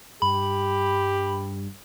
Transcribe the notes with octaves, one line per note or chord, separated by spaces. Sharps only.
G2 G4 B5